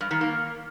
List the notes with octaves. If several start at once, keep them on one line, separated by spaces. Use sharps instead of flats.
G2
D#3
A#3